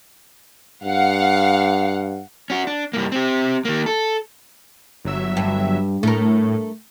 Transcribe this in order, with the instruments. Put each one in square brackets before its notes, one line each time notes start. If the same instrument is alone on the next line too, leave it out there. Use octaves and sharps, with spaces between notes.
[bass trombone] G2 [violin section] F5 F#5
[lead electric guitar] C#4 F#4
D4
G2 A#3
C4 G4
D#3 A#3
A4
[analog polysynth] G1 F#3 E5
[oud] G2
[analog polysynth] A2 [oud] A3 A#4